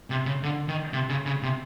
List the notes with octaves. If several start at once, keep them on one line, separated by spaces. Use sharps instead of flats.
C3
C#3
D3
D#3
C3
C#3
C#3
C3